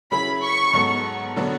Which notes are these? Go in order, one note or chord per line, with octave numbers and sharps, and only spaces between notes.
C#3 F#3 C#4 E4 G#4 B5
C#6
G#2 F#3 B3 F#4 A4
D3 F#3 B3 D4